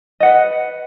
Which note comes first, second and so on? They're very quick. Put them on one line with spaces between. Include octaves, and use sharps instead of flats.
D#5 F#5 B4